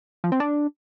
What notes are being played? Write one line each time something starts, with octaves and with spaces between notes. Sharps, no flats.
F3
C4
D4